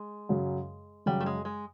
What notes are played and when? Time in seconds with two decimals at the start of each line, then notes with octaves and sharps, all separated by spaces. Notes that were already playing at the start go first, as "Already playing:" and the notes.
Already playing: G#3
0.29 F#2 C#3 F#3
1.06 F#2 C#3 F#3 G3
1.21 A3
1.26 G#3
1.45 G#3